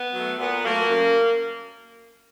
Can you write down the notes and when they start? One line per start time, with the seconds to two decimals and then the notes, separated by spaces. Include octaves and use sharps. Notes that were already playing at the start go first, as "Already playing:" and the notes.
Already playing: B3
0.14 F#3 A3
0.39 A#2 B3
0.65 F#3 A3 A#3
0.89 F#2